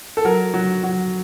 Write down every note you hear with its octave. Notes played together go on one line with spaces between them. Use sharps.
A4
F#3 A#4
F#3
F#3